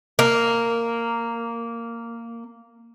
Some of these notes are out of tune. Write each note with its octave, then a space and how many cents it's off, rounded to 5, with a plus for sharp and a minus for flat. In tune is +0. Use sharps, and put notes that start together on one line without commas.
A#3 -10